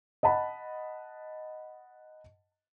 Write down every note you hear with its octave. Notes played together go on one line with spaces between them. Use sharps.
D#5 F#5 A5 B5